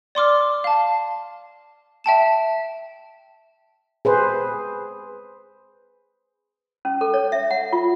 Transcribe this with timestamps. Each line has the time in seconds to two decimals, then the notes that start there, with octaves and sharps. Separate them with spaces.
0.15 D5 C6 D6 F6
0.64 F5 A5
2.04 E5 G5 A5 E7
4.05 G#4 B4 C5
6.85 C#4
7.01 A4
7.14 C#5
7.32 E5
7.51 F#5
7.73 F4